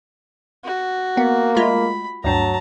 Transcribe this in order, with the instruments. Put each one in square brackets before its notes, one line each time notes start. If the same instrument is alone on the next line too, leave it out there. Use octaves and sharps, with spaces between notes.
[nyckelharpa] F#4
[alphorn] A#3 [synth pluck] B3
[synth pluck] G#3 A3 F4 [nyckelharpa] B5
[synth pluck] D2 G2 [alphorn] F#3 [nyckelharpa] A5 A#5